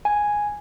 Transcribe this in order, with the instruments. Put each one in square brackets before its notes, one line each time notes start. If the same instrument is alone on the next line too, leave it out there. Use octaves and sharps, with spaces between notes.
[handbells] G#5